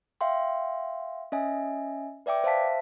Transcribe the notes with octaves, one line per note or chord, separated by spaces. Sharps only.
E5 F5 G5 C6
C#4 D#5 E5 G#5
B4 D5 E5 G5 D6
C5 E5 F5 A5 B6